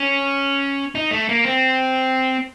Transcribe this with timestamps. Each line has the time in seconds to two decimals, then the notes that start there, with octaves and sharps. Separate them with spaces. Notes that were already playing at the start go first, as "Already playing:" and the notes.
Already playing: C#4
0.95 D#4
1.11 A3
1.29 A#3
1.45 C4